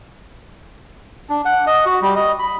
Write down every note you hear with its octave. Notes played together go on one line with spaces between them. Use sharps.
D4
F#5
D#5
F#4
G3
D#5
B5